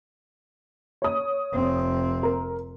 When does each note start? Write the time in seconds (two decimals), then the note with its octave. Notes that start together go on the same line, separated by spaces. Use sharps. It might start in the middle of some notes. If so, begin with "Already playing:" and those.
1.02 C#5 D#6
1.52 F1 C4
2.23 A#4